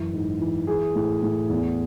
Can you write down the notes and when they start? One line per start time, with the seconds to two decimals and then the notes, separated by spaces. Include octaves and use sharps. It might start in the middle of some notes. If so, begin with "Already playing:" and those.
Already playing: F#2 E3 E4
0.13 G#2
0.40 E3
0.67 E3 G#4
0.95 A2
1.22 A2
1.50 E2